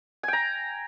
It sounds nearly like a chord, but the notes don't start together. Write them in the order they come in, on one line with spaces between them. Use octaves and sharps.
G#5 G5 A#5